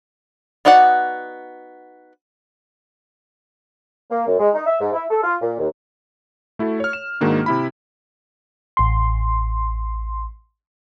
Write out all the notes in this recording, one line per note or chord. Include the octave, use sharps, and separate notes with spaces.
B3 D#4 F#4 D5 F#5
A#3
F#2
G#3
D#4
E5
G#2
E4
A4
F4
A#2
D#2
A3 E4 F#4 A4
C#5 F6
E7
G#2 D#3 G#3 A#3 D4 F#4
C3 E4 B5
A1 C6